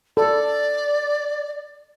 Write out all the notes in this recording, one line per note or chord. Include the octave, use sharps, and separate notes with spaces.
A4 D5